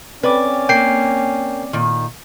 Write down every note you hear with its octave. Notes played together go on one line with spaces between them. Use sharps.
C4 C#4 B4 D5 D6
A#3 G5 C7
A#2 D#3